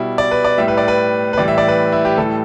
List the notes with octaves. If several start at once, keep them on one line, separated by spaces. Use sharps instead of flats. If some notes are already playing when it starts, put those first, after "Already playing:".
Already playing: B2 G3 E4
D5
B4
D5
A2 G3 E5
B4
D5
B4
B4
A2 E3 G3 D5
E5
D5
B4
E4
G4
A2 E3 G3 A4